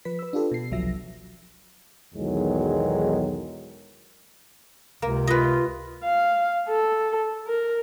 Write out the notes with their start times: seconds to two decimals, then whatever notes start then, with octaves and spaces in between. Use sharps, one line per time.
0.05 F3 B4 B6
0.19 B4 E6
0.33 D4 F4 G4 A4 B4
0.51 B2 C7
0.71 G1 C2 F3 F#3 E5 A#6
2.14 B1 E2 D#3 F#3 G#3
5.02 C#2 C3 A#3
5.27 F4 B4 D#5
6.04 F5
6.68 A4
7.47 A#4